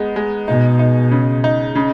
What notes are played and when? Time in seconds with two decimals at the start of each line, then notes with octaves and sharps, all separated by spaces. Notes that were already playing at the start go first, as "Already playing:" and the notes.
Already playing: G#3 B3 D#4
0.16 G#3
0.48 B2 D#4
0.79 D#4
1.11 C#3
1.44 D#4
1.75 C#3